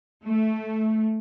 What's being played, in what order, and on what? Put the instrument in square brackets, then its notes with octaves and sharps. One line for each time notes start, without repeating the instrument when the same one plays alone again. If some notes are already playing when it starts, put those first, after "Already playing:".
[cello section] A3